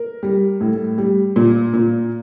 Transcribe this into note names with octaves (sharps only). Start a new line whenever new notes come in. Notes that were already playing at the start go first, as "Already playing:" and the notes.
Already playing: A#4
G3
A2
G3
A#2
A#2